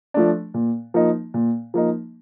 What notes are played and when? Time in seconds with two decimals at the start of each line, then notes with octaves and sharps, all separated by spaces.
0.14 F3 A3 D4
0.54 A#2
0.94 F3 A#3 D#4
1.34 A#2
1.74 F3 A#3 D#4